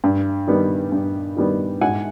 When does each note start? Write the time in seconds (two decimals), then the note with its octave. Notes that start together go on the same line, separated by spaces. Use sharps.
0.04 G2
0.47 D#3 G3 B3
0.92 G2
1.37 D#3 G3 B3
1.81 G#2 F#5 G#5